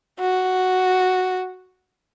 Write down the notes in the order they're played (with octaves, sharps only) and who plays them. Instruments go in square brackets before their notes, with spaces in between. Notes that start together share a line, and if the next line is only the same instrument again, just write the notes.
[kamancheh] F#4